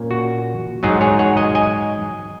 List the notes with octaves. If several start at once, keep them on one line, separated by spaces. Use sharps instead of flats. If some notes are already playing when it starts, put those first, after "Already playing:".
Already playing: A#2 A#3 C#4
F#4
G#2 F#3 D#4 G#4
G#4 C#5
C#5 F#5
D#5 G#5
D#5 G#5